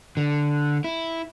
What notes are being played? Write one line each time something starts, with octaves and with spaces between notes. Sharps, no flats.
D3
E4